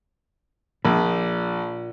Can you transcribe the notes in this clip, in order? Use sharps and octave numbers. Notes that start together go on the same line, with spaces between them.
A#1 A#2